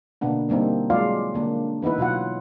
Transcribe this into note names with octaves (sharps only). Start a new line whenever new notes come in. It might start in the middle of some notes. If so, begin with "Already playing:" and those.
B2 D3 A#3 B3 D4
D3 G3 A#3 C4 D#4
F#3 G#3 F4 D5 F5
D3 A#3 D4
E3 B3 D#4 E4 B4
B2 F#3 F4 F#5